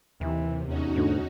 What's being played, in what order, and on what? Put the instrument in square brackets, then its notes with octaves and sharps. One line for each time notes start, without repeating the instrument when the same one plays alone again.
[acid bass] D#2 [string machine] C3 [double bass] E3
[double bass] E2 [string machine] C#4 D#4 F#4
[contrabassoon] D2 [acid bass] G#2